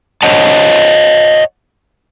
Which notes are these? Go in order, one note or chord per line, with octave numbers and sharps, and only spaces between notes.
C5 C#5 D#5 F#5 A5